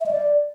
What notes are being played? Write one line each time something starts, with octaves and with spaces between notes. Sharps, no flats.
E5
D#5
D5